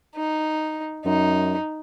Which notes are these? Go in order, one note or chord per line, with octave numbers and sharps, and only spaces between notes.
D#4
F#2 D#4